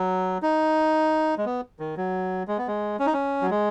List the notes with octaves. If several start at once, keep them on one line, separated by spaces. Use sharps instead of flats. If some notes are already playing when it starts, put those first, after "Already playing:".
Already playing: F#3
D#4
G#3
B3
D#3
F#3
G#3
B3
G#3
C#4
D#4
C#4
F#3
G#3